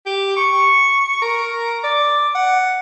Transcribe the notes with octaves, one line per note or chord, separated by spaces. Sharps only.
G4
C#6
A#4
D5
F#5